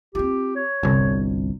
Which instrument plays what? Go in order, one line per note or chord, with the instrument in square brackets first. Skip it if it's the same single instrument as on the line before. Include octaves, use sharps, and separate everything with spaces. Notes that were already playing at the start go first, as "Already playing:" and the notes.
[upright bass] C4 F4 [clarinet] G4
[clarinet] C#5
[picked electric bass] G1 C2 [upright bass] C3